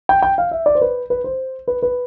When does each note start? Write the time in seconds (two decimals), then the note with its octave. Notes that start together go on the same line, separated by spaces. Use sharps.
0.09 G5
0.22 G5
0.38 F5
0.51 E5
0.66 D5
0.75 C5
0.81 B4
1.10 B4
1.24 C5
1.68 B4
1.82 B4